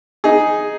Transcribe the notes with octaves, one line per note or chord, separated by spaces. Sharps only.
D#4 G#4